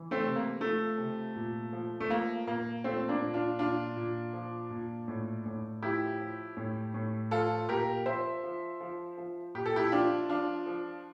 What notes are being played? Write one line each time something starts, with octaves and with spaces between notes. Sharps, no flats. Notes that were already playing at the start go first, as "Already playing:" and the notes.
Already playing: E3
A3 C4
C3
A#3
F3 A3
C3
A#2
F3
A3
F3 A#3
A#2 A#3
F3 A3 C4
A#3 D4
A#2
D4 F4
A#2 D4 F4
A#2
F3
A#2
A2
A2
F3 E4 G4
F3
A2
A2
F3 F4 A4
A#2 G4 A#4
F3 C5 E5
F3
F3
F3
A#2 G4
A4
E4 G4
F3 D4 F4
F3 D4 F4
F3